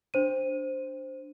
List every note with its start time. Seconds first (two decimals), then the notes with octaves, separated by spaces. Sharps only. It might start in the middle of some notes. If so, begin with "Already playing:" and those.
0.14 D4 C5 D#7